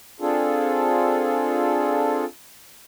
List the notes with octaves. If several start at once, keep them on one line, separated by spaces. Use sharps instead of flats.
C4 D4 F4 G#4 A4